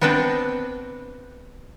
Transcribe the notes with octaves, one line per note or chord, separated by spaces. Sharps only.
B3 C4 D4 B4 G5 A#5